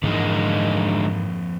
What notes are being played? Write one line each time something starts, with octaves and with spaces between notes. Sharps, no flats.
F2 G#2 D3 E3 G#3 A#3 D#4